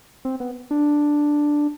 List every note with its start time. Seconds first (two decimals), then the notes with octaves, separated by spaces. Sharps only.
0.25 C4
0.40 B3
0.71 D4